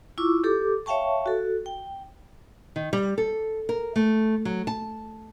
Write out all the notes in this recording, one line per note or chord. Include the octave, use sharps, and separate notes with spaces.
E4 F4 C#6 D6 E6
G4 A4 D6
C#5 E5 F5 G5 A5 C#6
F#4 A4
G5
D#3
G3
A4
A#4
A3
F#3
A5